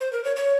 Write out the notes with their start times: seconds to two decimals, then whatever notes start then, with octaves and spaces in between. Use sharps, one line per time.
0.01 C5
0.13 A#4
0.25 C#5
0.36 C#5